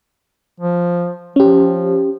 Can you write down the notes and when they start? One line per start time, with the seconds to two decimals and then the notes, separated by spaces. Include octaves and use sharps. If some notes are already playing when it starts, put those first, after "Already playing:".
0.60 F3
1.36 F3 C#4 G4